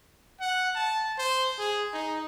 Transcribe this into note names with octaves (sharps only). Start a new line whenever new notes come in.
F#5
A5
C5
G#4
D#4